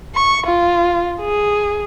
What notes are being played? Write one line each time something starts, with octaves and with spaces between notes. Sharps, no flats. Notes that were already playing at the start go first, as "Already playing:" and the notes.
C#6
F4
G#4